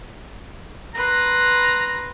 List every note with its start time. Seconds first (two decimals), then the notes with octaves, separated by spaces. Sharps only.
0.95 B4 A#5 C6